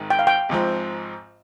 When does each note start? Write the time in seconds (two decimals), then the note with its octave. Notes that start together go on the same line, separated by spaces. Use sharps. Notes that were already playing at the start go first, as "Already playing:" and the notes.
Already playing: G#1 G#2 D#3
0.10 G5
0.19 F5
0.27 G5
0.49 G#1 G#2 F3 C4